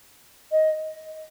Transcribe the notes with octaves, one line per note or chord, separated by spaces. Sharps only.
D#5